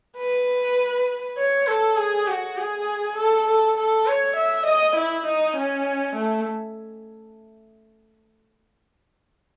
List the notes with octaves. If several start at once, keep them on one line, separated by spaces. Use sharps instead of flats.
B4
C#5
A4
G#4
F#4
G#4
A4
A4
A4
C#5
E5
D#5
E4
D#4
C#4
A3